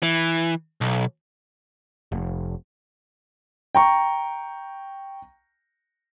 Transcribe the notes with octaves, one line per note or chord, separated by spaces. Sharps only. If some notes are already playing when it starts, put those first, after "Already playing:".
E3
B1
F1
G5 A#5 C#6